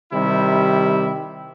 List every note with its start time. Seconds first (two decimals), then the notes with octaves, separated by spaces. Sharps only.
0.13 C3 D#3 G3 E4